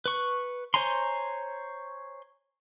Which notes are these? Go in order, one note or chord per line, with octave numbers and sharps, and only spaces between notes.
B4 C#6
C5 C#5 G#5 A#5 C6